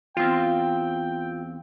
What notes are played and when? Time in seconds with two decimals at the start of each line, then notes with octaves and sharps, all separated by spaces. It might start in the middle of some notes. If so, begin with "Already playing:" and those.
0.17 E2 C4 F4 G5